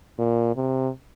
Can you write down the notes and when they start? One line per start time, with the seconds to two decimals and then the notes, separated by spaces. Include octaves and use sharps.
0.19 A#2
0.56 C3